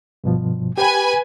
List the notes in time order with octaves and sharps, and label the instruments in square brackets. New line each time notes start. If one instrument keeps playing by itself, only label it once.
[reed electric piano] G2 B2 F3
[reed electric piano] G4 G5 [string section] B4 G#5